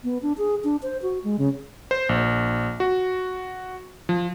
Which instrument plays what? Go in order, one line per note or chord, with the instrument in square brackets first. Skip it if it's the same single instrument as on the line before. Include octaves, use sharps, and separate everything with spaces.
[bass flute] B3
D4
G#4
D4
C5
F#4
G#3
C#3
[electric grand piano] C5
A#1
F#4
F3